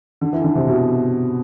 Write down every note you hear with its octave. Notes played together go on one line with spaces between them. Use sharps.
D3
E3
D3
C3
B2